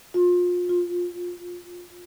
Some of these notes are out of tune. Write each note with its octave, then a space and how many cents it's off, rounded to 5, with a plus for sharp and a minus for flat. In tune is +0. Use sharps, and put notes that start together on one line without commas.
F4 +30
F4 +10